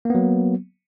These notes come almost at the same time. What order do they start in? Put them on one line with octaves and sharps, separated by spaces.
A#3 B3 F#3